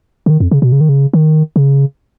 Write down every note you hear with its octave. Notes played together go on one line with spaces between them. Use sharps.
C#3
D#3
F2
C#3
B2
C#3
D#3
C#3
D#3
C#3